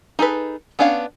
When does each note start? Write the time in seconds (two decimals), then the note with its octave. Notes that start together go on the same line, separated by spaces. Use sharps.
0.19 D#4 G#4 A4 B4
0.79 B3 C#4 D4 C#5 F5